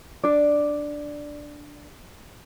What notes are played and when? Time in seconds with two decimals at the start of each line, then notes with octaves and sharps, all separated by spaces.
0.23 D4 D5